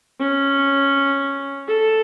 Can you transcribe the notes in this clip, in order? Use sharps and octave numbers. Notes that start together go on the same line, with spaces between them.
C#4
A4